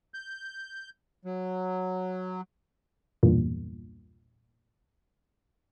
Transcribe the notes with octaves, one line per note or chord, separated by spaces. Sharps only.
G6
F#3
B1 E2 G2 A#2